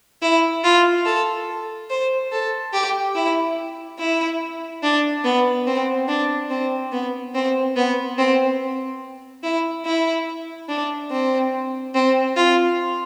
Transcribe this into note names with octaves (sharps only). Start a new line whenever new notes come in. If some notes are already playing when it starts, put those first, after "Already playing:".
E4
F4
A4
C5
A4
G4
E4
E4
D4
B3
C4
D4
C4
B3
C4
B3
C4
E4
E4
D4
C4
C4
F4